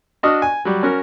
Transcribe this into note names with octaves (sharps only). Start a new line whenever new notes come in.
D4 F#4 D#5 D#6 F6
G#5
F#3 G3
C#4 F#4 A#4